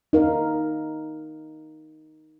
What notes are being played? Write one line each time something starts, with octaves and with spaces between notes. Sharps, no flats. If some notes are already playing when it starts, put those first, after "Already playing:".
D#4 A#4 F5